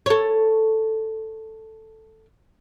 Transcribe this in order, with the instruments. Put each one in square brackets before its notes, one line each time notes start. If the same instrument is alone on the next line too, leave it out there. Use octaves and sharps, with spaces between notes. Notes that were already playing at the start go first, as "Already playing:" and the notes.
[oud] A4 C#5